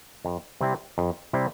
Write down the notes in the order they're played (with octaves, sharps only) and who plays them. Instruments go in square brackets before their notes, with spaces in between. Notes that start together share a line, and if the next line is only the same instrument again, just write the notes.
[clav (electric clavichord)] F2
C3 G3 C4 E4
F2
C3 G3 C4 E4